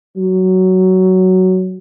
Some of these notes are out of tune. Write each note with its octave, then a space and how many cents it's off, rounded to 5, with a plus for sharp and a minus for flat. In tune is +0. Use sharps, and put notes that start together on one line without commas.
F#3 +10